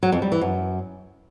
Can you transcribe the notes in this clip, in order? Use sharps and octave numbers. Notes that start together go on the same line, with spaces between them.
F#3
F2
G3
E3
F#2